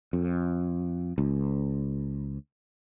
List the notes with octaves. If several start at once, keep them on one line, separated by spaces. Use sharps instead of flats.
F2
C#2